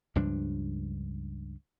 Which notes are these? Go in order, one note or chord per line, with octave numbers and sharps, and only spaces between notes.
C#2 G2 F3 D4